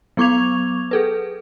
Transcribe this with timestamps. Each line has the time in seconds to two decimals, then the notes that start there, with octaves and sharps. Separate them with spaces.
0.17 F#3 B3 C#6 D6 G#6 F7
0.91 G#4 A4 B4